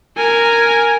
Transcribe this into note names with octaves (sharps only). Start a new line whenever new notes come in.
A#4 G#5